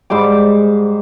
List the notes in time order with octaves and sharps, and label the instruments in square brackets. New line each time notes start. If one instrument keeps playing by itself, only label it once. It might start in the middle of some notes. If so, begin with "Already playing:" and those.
[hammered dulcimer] G#2 G3 C5 D6